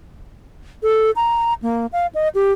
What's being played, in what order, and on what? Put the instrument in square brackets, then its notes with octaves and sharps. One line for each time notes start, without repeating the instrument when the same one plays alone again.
[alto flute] A4
A#5
A#3
F5
D#5
G4